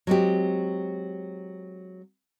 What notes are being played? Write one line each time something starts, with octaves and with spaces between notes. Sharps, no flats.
F#3 G#3 C4 G4